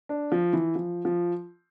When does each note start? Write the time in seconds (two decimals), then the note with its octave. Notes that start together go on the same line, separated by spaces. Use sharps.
0.09 D4
0.32 F3
0.53 E3
0.75 F3
1.05 F3